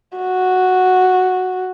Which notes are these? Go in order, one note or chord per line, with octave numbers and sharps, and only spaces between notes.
F#4